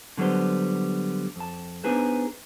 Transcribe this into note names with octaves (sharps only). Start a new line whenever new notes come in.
D3 F#3 G3 B3 C5
F2 A5
B3 D4 D#4 G#4 B4 C5